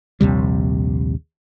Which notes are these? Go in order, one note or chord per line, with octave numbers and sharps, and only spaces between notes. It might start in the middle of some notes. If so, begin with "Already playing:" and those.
A#1 D#2 C3 G3